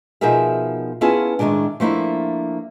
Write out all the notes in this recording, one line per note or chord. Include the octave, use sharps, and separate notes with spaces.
B2 F3 D#4 G#4 A#4 E5
B3 C#4 E4 F4 G#4 A5
A2 D#3 F3 G#3 D4
F3 A3 A#3 D4 E4